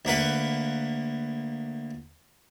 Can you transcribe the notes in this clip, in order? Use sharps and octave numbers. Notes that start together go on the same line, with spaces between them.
D2 A#3 B4 F#5